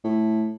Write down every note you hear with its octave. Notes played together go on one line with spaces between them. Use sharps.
A2